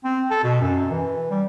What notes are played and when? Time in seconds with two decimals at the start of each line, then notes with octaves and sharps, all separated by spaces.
0.04 C4
0.31 A4
0.44 B2
0.61 F#2
0.91 E3
1.31 G3